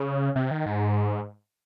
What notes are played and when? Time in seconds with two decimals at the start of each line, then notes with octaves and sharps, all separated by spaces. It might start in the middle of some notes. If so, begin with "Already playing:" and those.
Already playing: C#3
0.36 C3
0.51 D#3
0.66 G#2